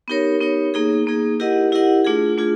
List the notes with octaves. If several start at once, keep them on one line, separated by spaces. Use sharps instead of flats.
B3 D#4 G4 A#4 C#5
B3 D#4 G4 A#4 C#5
A#3 D#4 G#4
A#3 D#4 G#4
E4 G4 A#4 D#5 F#5
E4 G4 A#4 D#5 F#5
A3 D4 F4 G#4
A3 D4 F4 G#4